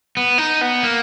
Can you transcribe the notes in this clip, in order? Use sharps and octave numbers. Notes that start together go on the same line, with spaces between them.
B3
D#4
B3
A#3